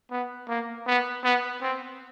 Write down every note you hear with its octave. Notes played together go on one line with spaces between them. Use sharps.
B3
A#3
B3
B3
C4